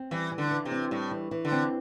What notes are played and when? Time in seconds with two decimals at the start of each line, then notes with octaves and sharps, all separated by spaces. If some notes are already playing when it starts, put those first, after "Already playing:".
Already playing: C4
0.11 E3 G3
0.32 E3
0.38 D3
0.51 E3
0.65 C3
0.71 C4
0.91 A2 G3
1.11 E3
1.31 E3
1.45 D3
1.52 C4